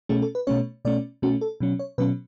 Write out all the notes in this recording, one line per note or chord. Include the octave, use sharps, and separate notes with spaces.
B2 A3 C#4 G#4
A4
B4
B2 A3 C#4 C#5
B2 A3 C#4 D5
B2 A3 C#4 F#4
A4
B2 F#3 C#4
C#5
B2 F#3 C#4 B4